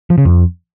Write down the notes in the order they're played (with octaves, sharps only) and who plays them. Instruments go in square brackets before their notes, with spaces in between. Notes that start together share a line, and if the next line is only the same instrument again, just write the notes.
[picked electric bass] F3
C#3
F2